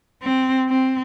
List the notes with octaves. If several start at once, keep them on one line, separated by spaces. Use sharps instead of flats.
C4
C4